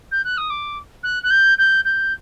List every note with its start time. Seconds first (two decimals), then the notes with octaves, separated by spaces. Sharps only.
0.11 G6
0.24 F#6
0.37 D#6
0.50 D6
1.03 F#6
1.23 F#6
1.30 G6
1.58 G6
1.84 G6